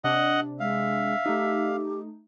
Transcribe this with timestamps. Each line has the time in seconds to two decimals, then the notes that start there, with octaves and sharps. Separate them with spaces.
0.04 C3 D4 D#5 F#5
0.60 G#3 E5 F5
1.26 A3 D#4 G4